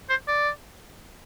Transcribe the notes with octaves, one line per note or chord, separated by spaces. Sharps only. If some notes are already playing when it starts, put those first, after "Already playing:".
C5
D5